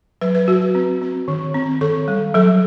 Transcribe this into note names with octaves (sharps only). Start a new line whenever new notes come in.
F#3 B4
B4
F#3 F#4
C4
C4
D#3
C4
D#3 A4
G3
F#3 A4